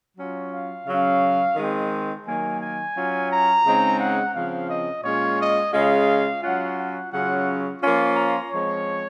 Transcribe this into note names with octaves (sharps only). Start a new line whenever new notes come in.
F#3 C#4 F4
F5
C#3 F#3 C#4 F5
D#3 G#3 C4
D#3 F#3 A#3 G#5
G#5
F#3 C#4 F4
A#5
C#3 G#3 C4 D#4
F#5
C#3 F3 C4 F5
D#5
A#2 G#3 C#4 F4 C#5
D#5
C#3 G#3 C#4 F4 F5
F#3 C#4 F4 F#5
F#5
C#3 F#3 C#4 F4 F#5
F3 A#3 C#4 F4
A#5
F3 G#3 C4 C#5